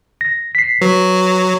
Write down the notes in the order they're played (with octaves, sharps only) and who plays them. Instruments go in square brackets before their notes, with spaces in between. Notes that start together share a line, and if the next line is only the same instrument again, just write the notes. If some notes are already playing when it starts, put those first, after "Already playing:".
[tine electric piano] A#6
B6 C7
[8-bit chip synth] F#3 [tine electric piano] B4